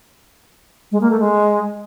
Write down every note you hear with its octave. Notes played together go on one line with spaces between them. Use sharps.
G#3
A#3
A3
G#3